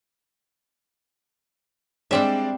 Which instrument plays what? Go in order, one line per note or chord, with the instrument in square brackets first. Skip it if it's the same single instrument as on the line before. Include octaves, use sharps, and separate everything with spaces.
[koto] G3 C4 E5 [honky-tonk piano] G#3 D4 D5